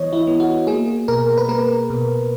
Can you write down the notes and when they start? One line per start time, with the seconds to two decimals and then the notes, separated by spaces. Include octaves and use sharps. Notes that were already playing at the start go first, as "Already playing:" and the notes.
Already playing: E3 B3 C#5 D#5
0.13 E4
0.27 B3
0.40 F#4
0.67 A#3 G#4
1.08 B2 A#4
1.38 B4
1.49 A#3 A#4
1.90 B2